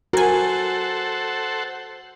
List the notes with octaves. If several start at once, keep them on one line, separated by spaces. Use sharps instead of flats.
F#4 A4 A#4 C5 F#5 G#5